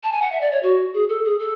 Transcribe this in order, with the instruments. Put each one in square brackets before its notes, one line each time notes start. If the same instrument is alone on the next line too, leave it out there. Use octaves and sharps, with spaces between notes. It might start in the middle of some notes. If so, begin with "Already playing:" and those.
[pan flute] A5
G#5
F#5
E5
D5
C#5
F#4
G#4
A4
G#4
A4